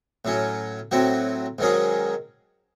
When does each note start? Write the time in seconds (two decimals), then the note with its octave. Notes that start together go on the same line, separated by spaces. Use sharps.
0.25 A2 F#3 C#4
0.91 A2 F#3 C4 F#4
1.59 G#2 D#3 F#3 C#4 G#4